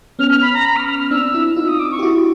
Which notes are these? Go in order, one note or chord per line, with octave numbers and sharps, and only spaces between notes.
B3 C#4 F6
F6
B5
A#5
B5
F6
F6
F6
C4 D4 E6
D4 E4
D#4 F4 E6
D#6
D6
C#6
G4
E4 F#4